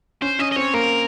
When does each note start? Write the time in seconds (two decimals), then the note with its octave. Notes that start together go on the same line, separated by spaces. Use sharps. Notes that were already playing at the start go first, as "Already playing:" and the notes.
0.22 C#4 C5
0.39 C#4 D#5
0.52 D#5
0.56 C4 C#5
0.74 A#3 A#4